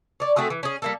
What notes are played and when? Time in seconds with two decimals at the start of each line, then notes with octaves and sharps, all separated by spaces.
0.20 C#5 D5
0.36 A3 C4 F#4 G#4
0.50 E3
0.63 C#4 G#4
0.82 G3 A#3 A4